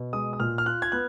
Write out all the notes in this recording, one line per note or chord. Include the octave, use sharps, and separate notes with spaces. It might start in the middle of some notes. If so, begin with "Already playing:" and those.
Already playing: B2
G#3 D#6
D#6
A#2 F6
F6
F4 F#6
G#6
B3 F#6